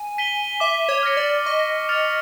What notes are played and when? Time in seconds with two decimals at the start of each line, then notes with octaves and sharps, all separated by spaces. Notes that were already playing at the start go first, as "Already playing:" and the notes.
Already playing: G#5
0.18 B6 D#7 G7
0.60 E5 D6
0.89 C#5
1.03 F6 A#6 C#7
1.17 D5
1.46 D#5 C#6
1.89 F6 A6 C#7 F7